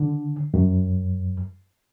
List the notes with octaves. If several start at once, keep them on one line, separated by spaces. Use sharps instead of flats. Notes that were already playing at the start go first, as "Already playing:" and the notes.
Already playing: D3
F#2